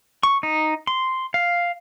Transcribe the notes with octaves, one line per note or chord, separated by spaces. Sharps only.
C#6
D#4
C6
F5